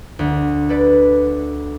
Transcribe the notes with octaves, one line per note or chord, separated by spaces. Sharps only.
D2
A4 B4 D5